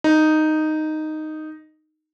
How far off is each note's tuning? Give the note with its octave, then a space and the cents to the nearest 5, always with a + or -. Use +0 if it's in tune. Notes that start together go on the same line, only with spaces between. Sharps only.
D#4 -5